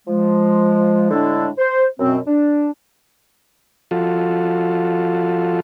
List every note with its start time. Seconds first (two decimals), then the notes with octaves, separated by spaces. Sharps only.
0.07 F3 G#3
1.10 A2 D3 G#3 D4 E4 A4
1.58 C5
1.99 F#2 B2 C4
2.26 D4
3.91 F3 F4 F#4 A4